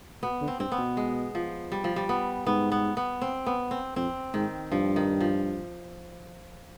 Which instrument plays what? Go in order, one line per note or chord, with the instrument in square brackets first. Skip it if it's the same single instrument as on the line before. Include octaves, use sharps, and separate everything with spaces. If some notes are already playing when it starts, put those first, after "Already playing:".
[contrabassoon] B2 [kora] B3
[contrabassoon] D3
[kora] C4
[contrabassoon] G2 [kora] C4
[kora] B3
[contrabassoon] B2
[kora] G#3
F3
G3
F3
G3
B3
[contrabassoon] G#2 [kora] B3
[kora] B3
B3
C4
B3
C4
[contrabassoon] F2 [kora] C4
[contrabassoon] G#2 [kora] D#3
[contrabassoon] G2 [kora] F3
[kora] D#3
F3